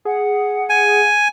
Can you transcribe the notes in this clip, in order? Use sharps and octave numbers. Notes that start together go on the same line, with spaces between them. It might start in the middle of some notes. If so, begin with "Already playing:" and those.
G#4 F#5
G#5